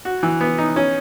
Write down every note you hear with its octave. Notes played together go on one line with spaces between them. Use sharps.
F#4
E3
B3
D#4
C#4